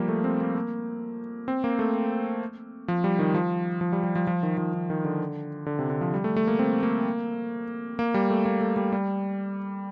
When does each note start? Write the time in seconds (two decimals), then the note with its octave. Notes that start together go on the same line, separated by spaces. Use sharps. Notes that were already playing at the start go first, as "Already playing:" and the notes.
Already playing: F3 G3 A#3
0.09 A3
0.24 C4
0.41 A#3
0.55 A#3
1.48 C4
1.64 A#3
1.79 A3
2.88 F3
3.04 G3
3.19 D#3
3.34 F3
3.81 F3
3.92 G3
4.04 G3
4.15 F3
4.27 F3
4.43 D#3
4.58 F3
4.74 D#3
4.90 D#3
5.05 D3
5.66 D3
5.79 C3
5.90 D3
6.01 F3
6.14 G3
6.24 A3
6.36 A3
6.47 A#3
6.59 C4
6.83 A#3
7.99 A#3
8.14 G3
8.30 A3
8.45 A#3
8.61 A3
8.77 G3
8.92 G3